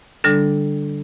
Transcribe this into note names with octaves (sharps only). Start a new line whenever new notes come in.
D3 G3 D4 A4